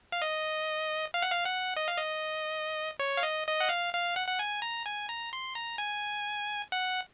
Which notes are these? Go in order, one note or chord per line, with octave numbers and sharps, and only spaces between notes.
F5
D#5
F5
F#5
F5
F#5
D#5
F5
D#5
C#5
F5
D#5
D#5
F#5
F5
F5
F#5
F#5
G#5
A#5
G#5
A#5
C6
A#5
G#5
F#5